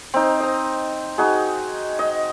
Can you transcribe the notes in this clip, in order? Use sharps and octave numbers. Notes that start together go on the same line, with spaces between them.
C4 D#4
D#5 A#5
D#4 F#4 G#4
D#5